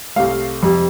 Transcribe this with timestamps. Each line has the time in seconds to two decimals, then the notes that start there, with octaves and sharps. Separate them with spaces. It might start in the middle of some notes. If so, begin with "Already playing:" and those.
0.16 C2 C3 A3 F5
0.63 F2 C3 G3